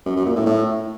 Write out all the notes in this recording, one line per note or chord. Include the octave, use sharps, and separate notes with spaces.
F#2
F#2
A#2
A2
A2